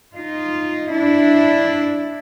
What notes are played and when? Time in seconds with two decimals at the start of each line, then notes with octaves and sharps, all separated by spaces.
0.15 D#4 F4
0.92 D4 E4